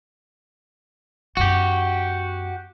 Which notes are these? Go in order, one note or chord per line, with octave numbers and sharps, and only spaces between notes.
F#2 B3 F#4 G4